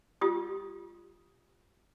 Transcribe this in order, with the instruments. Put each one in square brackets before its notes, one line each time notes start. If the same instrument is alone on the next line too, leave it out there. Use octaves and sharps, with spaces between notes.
[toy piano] F4 G4 D#6